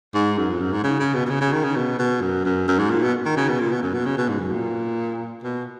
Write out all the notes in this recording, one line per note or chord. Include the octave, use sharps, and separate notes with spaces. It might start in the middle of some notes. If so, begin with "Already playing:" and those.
G#2
F#2
F2
F#2
G#2
C#3
C#3
B2
B2
C#3
C#3
D#3
C#3
B2
B2
F#2
F#2
F#2
G#2
A#2
B2
D#3
C#3
B2
A#2
B2
F#2
B2
C#3
B2
G#2
F#2
A#2
B2